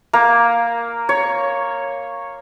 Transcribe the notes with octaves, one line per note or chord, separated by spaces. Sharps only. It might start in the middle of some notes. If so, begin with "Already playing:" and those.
A#3
C#5